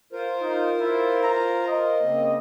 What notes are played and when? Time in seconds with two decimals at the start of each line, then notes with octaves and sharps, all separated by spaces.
0.13 F4 A#4 C5
0.41 D#4
0.80 E4
1.23 A#5
1.68 D#5
2.00 C#3 A#3 C4